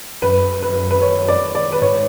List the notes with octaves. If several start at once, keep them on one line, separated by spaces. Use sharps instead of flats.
F#2 B4
B4
B4
C#5
D5
D5
B4
G#2 C#5